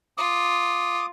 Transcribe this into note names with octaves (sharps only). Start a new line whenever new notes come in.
F4 D6 D#6